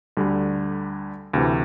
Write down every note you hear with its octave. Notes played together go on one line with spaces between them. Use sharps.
D2 D3 G3
D2 C3 E3